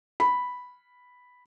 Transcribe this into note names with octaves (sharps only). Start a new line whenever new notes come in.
B5